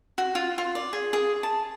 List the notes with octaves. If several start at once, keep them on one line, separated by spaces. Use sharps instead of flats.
F#4
F4
F4
D5
G#4
G#4
A5